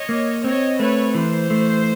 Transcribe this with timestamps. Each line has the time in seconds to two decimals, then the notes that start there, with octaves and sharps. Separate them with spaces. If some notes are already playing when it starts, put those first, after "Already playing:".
Already playing: C#5 D#5
0.09 A#3
0.44 C4 C#5 D#5
0.80 A3 B4 C#5
1.14 E3 C5
1.50 A3